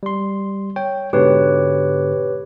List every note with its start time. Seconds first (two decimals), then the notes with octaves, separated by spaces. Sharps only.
0.03 G3 C6
0.76 C#5 G5
1.13 G#2 B2 D3 G4 B4 C#5